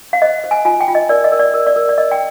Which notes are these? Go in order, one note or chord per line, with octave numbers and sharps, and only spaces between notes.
F5
C5 D#5
C5
G#5
F4 G#5
G5
F4
D#5
A#4 D5
D#5
A#4
D5
A#4
D5
A#4
D5
A#4 D#5
G5